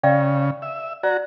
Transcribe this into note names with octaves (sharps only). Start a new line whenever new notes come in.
C#3 D5 F5 G5
E5
F#4 D5 A#5